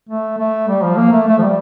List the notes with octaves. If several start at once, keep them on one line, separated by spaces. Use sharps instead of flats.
A3
A3
G3
F3
A#3
A3
A3
F3
G3